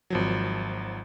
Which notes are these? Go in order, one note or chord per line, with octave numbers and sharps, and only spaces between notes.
G#1 F3 F#3